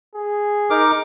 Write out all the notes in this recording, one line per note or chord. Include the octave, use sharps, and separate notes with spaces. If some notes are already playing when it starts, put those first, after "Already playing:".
G#4
D#4 A#4 D6